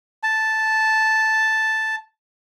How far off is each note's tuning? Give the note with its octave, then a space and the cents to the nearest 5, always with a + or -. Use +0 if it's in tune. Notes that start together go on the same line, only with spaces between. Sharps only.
A5 -5